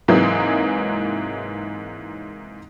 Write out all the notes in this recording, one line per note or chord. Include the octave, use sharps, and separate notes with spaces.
G#2 C3 E3 F#3 G#3 A#3